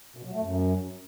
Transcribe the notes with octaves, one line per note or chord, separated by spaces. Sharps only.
B2
F#3
A3
F#2